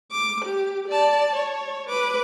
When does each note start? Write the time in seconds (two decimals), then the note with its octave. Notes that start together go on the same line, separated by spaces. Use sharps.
0.12 D6
0.45 G4
0.88 D5 A5
1.35 C#5
1.89 B4 D6